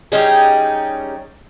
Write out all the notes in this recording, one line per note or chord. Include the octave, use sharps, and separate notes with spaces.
G3 C#4 D#4 G#4